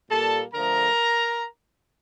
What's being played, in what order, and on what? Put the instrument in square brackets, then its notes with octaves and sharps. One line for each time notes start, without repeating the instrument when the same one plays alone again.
[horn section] A#2 G3 A#3 A4 A5
D3 F3 A3 A#4 A#5